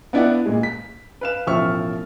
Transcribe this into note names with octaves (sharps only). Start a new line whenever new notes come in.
B3 D4 E4 D5 F5 F#5
A#2 G#3
B6
B4 F5 E7
E1 A1 F3 E5 C#6 F6